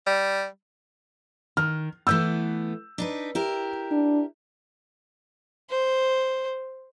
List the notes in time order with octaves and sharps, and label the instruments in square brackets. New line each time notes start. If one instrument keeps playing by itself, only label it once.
[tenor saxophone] G3
[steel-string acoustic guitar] D#3 [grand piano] F6
[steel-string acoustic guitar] E3 A3 B3 [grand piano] E6 G6
[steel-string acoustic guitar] D4 D#4 B4
E4 G4 A#4
[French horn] D4
[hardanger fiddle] C5